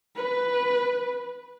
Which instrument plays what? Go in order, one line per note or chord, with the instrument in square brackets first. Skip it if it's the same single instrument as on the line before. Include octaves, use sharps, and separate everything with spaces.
[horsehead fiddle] B4